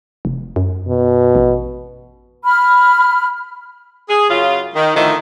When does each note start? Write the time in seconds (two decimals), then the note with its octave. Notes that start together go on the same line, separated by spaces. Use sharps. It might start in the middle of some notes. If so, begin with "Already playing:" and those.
0.25 F1
0.56 F#2
0.88 B2
1.35 A1
2.45 B5 F6
4.09 G#4
4.29 F#2 C#3 F4
4.75 D#3
4.95 A2 D3 D#3 F3 A3